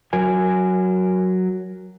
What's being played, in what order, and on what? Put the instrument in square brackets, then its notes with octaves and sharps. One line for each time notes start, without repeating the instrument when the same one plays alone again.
[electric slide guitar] F#3 A#4 G#5